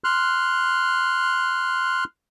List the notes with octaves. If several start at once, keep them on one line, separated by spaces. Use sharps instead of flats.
C6 F6 F#6